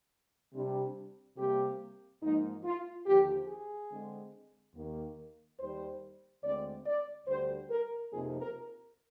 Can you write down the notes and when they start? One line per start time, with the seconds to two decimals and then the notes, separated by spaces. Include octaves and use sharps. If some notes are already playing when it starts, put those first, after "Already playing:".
0.54 C3 G3 D4
1.37 C3 G3 A#3 G4
2.22 G#2 F3 A#3 D#4
2.64 F4
3.06 D#2 D3 F3 G4
3.48 G#4
3.91 D3 G#3 C4
4.74 D#2 D#3 A#3
5.59 D#2 D#3 G3 C5
6.44 D2 D3 G#3 C4 D5
6.86 D5
7.27 D2 D3 G3 C5
7.70 A#4
8.11 F2 C3 F3 A#3 D#4 G#4
8.40 A#4